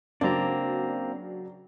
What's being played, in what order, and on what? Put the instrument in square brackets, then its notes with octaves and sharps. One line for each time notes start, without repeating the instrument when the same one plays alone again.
[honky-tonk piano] C#3 F#3 [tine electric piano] A#3 C4 A#5 [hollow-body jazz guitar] D4